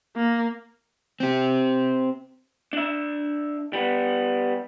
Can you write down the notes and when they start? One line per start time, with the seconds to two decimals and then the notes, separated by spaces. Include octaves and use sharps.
0.16 A#3
1.20 C4 G4
2.73 D4 E5
3.73 G3 B3